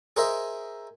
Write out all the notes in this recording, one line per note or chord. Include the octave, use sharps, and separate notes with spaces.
G#4 A#4 C5 D#5 E5